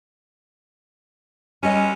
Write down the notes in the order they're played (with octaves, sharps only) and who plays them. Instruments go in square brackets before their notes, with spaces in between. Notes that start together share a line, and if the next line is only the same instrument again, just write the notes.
[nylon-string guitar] G3 D#5 [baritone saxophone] C#4